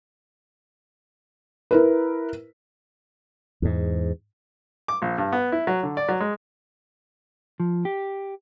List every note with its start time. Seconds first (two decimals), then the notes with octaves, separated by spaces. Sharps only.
1.71 E4 A#4 B4
3.62 E2 G#2
4.88 D6
5.02 A#1
5.18 G2
5.32 B3
5.52 E4
5.67 F#3
5.83 D3
5.97 D5
6.09 F#3
6.20 G#3
7.60 F3
7.85 G4